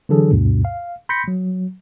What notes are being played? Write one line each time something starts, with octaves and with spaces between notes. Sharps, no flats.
D3 E3 F#3 D4 G#4 A4
D2 G2 B2
F5
B5 C6 G6 A#6 B6 C#7
F#3